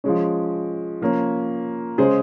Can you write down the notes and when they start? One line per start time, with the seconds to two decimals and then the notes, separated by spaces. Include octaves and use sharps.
0.04 F3 G#3 C#4
1.01 F3 A#3 C#4
1.98 C#3 G#3 C#4 G#4 C5